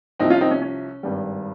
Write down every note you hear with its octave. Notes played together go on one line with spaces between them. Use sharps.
C2 C3 F3 C4 D#4
C#4 F4
C4 D#4
C#4
C#4
G#1 G2 G3